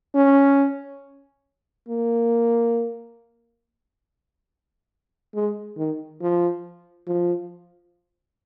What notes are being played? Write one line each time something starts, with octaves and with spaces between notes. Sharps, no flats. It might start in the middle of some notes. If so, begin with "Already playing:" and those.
C#4
A#3
G#3
D#3
F3
F3